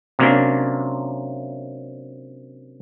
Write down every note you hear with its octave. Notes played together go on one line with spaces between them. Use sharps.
C3 F#3 A#3 C#4 D4